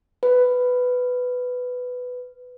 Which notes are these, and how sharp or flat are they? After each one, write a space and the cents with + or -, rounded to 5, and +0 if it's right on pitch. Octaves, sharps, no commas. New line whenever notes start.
B4 +10